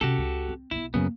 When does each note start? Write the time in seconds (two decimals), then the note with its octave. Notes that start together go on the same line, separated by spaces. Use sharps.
0.01 C3 C#4 F#4 G4 A4
0.18 C#2
0.48 C4
0.71 B1 B3 E4
0.94 F#2 C#3 A#3 B3